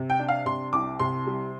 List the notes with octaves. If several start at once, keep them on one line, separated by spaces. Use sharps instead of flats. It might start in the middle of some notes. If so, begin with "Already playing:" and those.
Already playing: C3
G5
D4
F5
C3 C6
C2 D6
C3 C6
G3